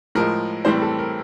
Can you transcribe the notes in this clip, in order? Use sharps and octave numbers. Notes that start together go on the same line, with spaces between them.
A2 F3 G#3 A#4
A2 E3 G3 C4 C5
A4
A#4